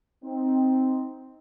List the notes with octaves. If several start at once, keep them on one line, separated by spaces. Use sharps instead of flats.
C4 D#4